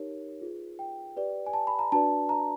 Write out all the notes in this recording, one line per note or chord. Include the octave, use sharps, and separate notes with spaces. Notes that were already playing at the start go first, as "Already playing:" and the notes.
Already playing: D#4 G4 A#4 C#5
F4 G#4 B4
G5
G4 B4 D5
G#5
A5
B5
A#5
D4 F#4 B4 D5 A5
A#5